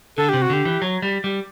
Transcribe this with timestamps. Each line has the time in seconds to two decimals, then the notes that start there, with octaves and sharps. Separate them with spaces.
0.17 D3 A4
0.29 C3 G4
0.42 F#4
0.50 D3 G4
0.65 E3
0.82 F#3
1.02 G3
1.24 G3